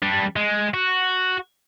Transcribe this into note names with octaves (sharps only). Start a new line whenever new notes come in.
G3 D4
G#3
F#4